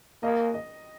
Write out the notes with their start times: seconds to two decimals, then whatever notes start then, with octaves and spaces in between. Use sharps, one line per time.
0.23 A#3 D#5
0.54 D#5